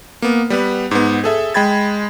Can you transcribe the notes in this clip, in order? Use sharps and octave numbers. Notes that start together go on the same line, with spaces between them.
A#3 B3
G3 B3 B4
G#2 B3
G#4 A4 E5
G#3 G5 B5 G#6 A6